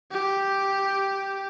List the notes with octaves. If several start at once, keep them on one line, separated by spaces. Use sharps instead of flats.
G4